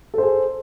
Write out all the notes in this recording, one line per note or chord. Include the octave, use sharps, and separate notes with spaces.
G#4 A4 C5